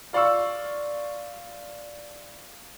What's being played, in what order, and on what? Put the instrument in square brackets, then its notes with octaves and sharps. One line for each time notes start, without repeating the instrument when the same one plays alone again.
[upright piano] F4 D5 F5 C#6 E6